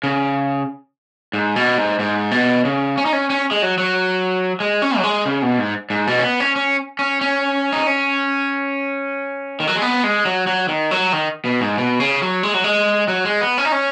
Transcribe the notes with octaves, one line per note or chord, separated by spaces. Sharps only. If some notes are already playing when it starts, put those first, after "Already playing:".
C#3
G#2
B2
G#2
G#2
B2
C#3
C#4
D#4
C#4
C#4
G#3
F#3
F#3
G#3
C#4
F#3
G#3
C#3
B2
G#2
G#2
B2
C#4
B3
C#4
C#4
C#4
C#4
D#4
C#4
D#3
F#3
G#3
B3
G#3
F#3
F#3
D#3
F#3
D#3
B2
G#2
B2
C#3
F#3
G#3
F#3
G#3
F#3
G#3
B3
C#4
D#4
C#4